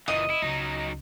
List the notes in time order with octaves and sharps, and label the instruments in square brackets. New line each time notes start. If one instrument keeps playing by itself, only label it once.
[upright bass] F#1 [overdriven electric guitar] A#2 E3 [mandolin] D#5
[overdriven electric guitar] E4
[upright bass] C#2 [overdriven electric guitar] F#3 D#4